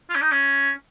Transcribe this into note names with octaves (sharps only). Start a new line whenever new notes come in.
F4
C#4
D#4
C#4